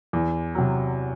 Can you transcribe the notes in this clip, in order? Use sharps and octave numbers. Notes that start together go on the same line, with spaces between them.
E2
C3 F#3